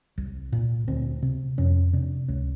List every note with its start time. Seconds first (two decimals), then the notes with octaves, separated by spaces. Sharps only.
0.18 C2
0.52 A#2
0.88 D2 C4
1.22 C3
1.58 F2 C#4
1.93 C3 D4
2.28 C#2 C#4